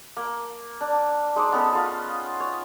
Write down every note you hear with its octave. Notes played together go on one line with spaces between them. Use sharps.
A#3
D4
G#3 D#4 C5 D6
B3 C#4 A4
F4 G#4
C#5